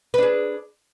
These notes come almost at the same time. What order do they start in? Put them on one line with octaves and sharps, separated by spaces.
B4 D4 G#4